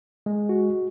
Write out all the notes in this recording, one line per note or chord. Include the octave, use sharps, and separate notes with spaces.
G#3
F#4